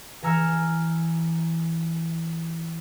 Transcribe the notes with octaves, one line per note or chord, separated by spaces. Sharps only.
E3 G#5 A#5 E6 F6 C#7